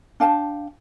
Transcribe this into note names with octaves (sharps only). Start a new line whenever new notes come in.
D4 F5 G5 A5